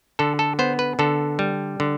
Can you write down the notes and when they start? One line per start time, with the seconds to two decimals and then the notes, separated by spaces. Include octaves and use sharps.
0.19 D3 A4
0.39 A4
0.59 B3 C5
0.79 B4
0.99 D3 A4
1.39 G3
1.80 D3